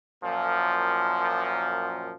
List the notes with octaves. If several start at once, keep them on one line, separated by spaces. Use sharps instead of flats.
F#2 A#2 F3